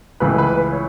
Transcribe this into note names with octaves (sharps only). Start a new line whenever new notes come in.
C#2 C#3 E3 A3 B4
B4
B4
C#5